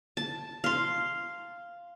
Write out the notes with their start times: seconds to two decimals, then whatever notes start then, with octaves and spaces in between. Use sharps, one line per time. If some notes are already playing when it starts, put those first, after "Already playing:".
0.17 A5
0.64 F5 C6